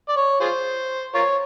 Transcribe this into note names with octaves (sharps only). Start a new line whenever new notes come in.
D5
C#5
F4 G#4 C5
F4 A#4 C#5